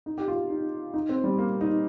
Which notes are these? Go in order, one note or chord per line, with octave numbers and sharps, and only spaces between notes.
D#4
G4
F4
D#4
D#4
C4
G3
A#3
D#4